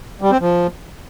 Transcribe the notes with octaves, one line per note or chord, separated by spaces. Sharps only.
G3
C4
F3